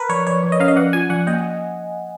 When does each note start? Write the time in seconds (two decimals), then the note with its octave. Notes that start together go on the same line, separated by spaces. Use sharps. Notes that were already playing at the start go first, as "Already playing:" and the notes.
Already playing: A#4 B4
0.09 F3 C#5
0.27 F3 C#5
0.43 F3
0.52 D#5
0.60 C#4 F5
0.68 D#5
0.76 F3 F#5
0.93 F4 G#5
1.09 F3 F#5
1.27 A#3 D#5